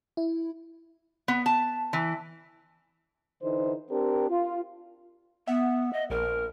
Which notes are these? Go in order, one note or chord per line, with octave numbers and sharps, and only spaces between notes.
E4
B3
A5
E3
D3 E3 D#4 C5
C4 D4 G4 A#4
F4
B3 E5 F#5
D#5
A#1 A#4